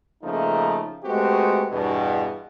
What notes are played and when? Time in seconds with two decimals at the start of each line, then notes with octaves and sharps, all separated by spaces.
0.23 C#3 F3 A3 A#3 D#4
1.04 G#3 A3 B3 C4 F#4 G4
1.71 E2 G2 B2